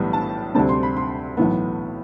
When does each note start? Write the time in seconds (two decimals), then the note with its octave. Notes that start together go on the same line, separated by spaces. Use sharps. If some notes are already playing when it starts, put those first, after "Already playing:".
Already playing: B1 A2 E3 G3 B3
0.13 A5
0.55 D2 C3 G3 C4 A5
0.69 C6
0.83 B5
0.97 C6
1.37 B1 A2 E3 B3